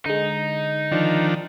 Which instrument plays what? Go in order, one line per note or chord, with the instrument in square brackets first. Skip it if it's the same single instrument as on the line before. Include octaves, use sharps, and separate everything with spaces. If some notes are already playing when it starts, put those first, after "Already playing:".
[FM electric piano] D3 G#3 [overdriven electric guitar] D#4
[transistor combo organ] D#3 F3 D4